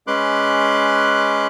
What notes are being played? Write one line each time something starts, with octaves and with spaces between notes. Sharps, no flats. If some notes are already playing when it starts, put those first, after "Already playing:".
G#3 C#4 B4 C6 D6 F#6